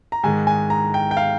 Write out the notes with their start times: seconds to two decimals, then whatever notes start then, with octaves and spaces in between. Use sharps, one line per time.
0.12 A#5
0.23 G#2 D#3 G#3 G#5
0.47 G#5
0.70 A#5
0.94 G5
1.11 G5
1.17 F5